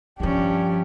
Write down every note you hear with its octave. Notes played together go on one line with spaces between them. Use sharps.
G2 D#3 F3 C#4 D4 G4